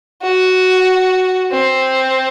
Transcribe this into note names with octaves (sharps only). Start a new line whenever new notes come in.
F#4
C4